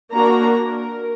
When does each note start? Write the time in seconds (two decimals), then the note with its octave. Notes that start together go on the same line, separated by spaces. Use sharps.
0.12 A#3 D4 F#4 A#5
0.62 A#4